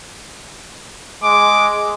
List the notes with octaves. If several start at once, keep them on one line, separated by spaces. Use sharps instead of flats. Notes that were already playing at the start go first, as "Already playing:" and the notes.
G#3 D6